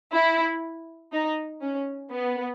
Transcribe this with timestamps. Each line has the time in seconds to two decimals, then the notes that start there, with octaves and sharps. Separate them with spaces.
0.12 E4
1.12 D#4
1.61 C#4
2.11 B3